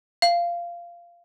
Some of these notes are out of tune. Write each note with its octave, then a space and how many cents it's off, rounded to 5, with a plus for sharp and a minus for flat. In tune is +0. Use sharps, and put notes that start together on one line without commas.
F5 -15